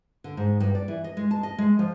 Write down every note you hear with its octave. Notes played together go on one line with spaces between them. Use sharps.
D3
G#2
G2
D5
E3
D#5
G#3
A5
D#5
G#3
F3